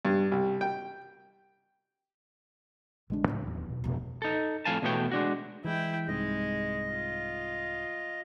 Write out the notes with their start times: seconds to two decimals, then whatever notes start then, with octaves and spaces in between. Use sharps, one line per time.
0.05 G2
0.32 C2
0.61 G5
3.10 A1 D3 G#3 C#4 D4
3.28 D1 D#2 A2 C#3
3.43 D#1 E2
3.70 B2
3.84 E1 F2
4.22 D#4 A4
4.65 F2 A2 F#3 F5 G#5 A5
4.82 E2 B2 A3 B3 C#5 G5
5.11 G#3 D4 F#4
5.64 E3 G#3 E4 G5
6.08 C2 G#2 G#3 D#5
6.89 F4